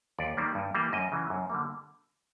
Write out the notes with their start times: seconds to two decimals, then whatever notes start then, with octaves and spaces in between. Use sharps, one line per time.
0.18 D#2 D5
0.37 D#3 G3 A#3
0.55 G2
0.74 E3 G3 A#3
0.93 F#2 D#5
1.12 C#3 E3
1.30 F#2
1.50 D3 G3 A#3